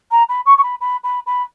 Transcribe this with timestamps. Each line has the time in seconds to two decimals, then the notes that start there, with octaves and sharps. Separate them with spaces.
0.11 A#5
0.29 B5
0.46 C#6
0.58 C#6
0.63 B5
0.81 B5
1.04 B5
1.27 B5